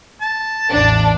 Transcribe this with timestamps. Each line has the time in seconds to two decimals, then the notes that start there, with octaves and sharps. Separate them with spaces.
0.21 A5
0.72 A1 E2 D4